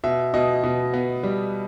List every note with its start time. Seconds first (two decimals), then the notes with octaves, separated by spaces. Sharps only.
0.04 B2 E5
0.34 B2 D#5
0.63 B2
0.94 B3
1.23 G3